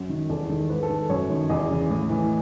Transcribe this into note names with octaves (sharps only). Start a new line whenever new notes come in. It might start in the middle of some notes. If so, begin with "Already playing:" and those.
Already playing: F#2
D#3
E2 A4
D#3
G#2 B4
A4
D#3
F#2 C#5
D#3
E2 D#5
C#3 E3
A2
E3